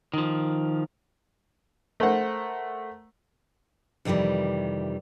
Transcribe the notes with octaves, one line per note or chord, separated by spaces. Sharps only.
D#3 F3
A3 A#4 C5 F#5
F2 C3 D#3 E3 G3